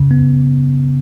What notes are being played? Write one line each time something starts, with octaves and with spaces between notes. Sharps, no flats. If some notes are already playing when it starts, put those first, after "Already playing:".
Already playing: C#3
B3